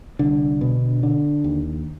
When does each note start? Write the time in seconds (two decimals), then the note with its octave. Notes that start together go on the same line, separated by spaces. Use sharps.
0.19 C2 D3 D4
0.61 B2
1.03 D3
1.44 D#2